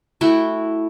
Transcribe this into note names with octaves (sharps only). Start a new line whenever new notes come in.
A3 E4 F#4 G5